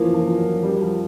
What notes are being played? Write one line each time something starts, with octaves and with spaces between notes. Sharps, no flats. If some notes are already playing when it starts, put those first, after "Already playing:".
Already playing: E3 F3 A#3
F3
F#3
G3
F3